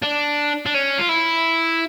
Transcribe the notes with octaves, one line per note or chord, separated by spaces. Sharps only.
D4
D4
C#4
F4
E4